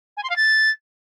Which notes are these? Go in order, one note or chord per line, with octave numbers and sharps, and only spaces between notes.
G#5
C6
F5
A6